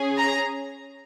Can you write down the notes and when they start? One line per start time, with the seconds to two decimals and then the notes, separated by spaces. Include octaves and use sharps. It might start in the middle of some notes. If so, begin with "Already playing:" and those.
Already playing: C#4 G#4
0.17 A#5